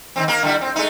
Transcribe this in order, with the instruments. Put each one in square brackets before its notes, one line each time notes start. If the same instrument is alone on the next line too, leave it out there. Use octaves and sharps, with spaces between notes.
[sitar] D#3 F#3 C4
A#3 A#4
D3 G3 E4
C4
G#3 A3 D#4